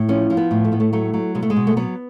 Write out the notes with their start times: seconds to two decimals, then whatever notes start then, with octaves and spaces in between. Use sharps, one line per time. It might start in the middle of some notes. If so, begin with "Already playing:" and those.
Already playing: A2
0.09 F3 C#4
0.30 F3
0.37 B3
0.51 A2
0.65 A3
0.72 A2 B3
0.80 A3
0.93 F#3 A3
1.14 F#3
1.35 B2 G#3
1.42 A3
1.50 G#3
1.56 B2
1.67 A3
1.77 F#3 B3